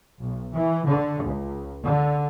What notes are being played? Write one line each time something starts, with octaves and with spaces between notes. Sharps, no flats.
B1
E3
D3
C#2
D3